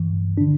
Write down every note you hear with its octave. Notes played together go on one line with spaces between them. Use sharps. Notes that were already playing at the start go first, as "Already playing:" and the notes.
Already playing: G2 E3
D3 D4